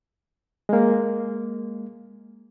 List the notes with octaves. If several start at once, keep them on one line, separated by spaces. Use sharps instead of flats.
G#3 A#3